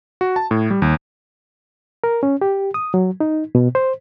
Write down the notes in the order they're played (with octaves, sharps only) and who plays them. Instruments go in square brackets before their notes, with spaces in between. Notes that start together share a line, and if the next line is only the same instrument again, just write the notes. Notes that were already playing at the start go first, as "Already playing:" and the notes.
[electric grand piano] F#4
A5
A2
G3
D#2
[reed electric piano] A#4
C#4
G4
D#6
F#3
D#4
B2
C5